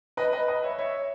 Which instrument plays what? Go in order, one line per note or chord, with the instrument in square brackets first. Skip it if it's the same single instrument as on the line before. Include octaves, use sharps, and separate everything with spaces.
[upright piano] B4 D#5
B4 D#5
B4 D#5
C#5 E5
C#5 E5